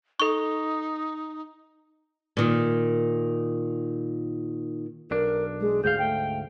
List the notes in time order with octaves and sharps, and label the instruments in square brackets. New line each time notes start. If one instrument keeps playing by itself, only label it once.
[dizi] D#4 [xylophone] A4 C#6
[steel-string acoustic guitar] A#2 D#3
[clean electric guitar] B1 D4 [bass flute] A#4
[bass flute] G#3
[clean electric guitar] D2 G#2 F5 [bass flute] G#3 [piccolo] G6
[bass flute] A3 [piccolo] G5